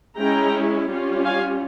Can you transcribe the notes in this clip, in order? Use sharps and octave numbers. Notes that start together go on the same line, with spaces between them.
G#3 C#4 E4 G5 A#5
G3 C#4 F4
F5 G#5